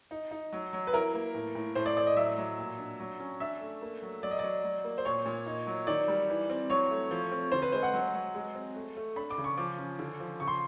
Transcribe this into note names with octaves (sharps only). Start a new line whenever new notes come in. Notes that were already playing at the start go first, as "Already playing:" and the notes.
D#4
D#4
F#3
F#3
B4
E4 A#4
A#3
A2
A2
A2 C5
D5
A2 D5
D#5
F#3 E5
F#3
A#2
D4
F#3
C#4
D4 E5
A3
A#3
F#3
F#3 D5
D#5
F#3 D5
F#3
A#3
C5
A#2 C#5
A#2
D#4
F#3
D#3 D5
G3
E3
C4
F#3 C#5
A3
F3
C4
D3 C5
B4
G#3 C5
F#5
F#3
F#3
G#3
C4
A3
A3
D4 B5
D6
C#3
C#6
F3 D6
C#4
D3
F3
C#3 C#6
C6